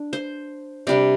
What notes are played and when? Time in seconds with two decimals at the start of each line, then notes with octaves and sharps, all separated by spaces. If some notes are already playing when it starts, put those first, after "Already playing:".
Already playing: D4
0.13 C5
0.87 C3 G3 D4 D5